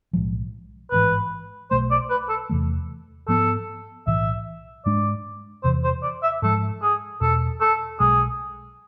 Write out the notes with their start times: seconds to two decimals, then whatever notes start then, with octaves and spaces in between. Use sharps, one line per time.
0.13 B1 A2 F3 G#3
0.91 A1 G#2 E3 B4
1.71 B1 B2 A3 C5
1.91 D5
2.10 B4
2.29 A4
2.49 E2 C3 E3 A3
3.28 G#2 F3 B3 A4
4.06 B1 A2 E3 E5
4.85 G#2 G#3 D4 D5
5.63 E2 C3 E3 C5
5.84 C5
6.03 D5
6.23 E5
6.42 G#2 F3 G#3 A4
6.82 G#4
7.21 E1 E2 B2 A4
7.61 A4
8.00 B1 B2 G#3 G#4